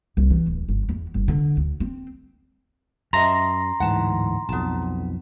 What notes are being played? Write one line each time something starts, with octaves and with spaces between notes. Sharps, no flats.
C2
E3
D1
G1
E2
G1
D3
D2
C4
F#2 D#5 E5 A5 A#5 C6 A#6
D1 G#2 E3 F#5 A5
B1 F2 B3 A5